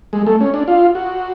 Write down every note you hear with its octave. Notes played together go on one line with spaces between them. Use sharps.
G#3
A3
C#4
D4
F4
F#4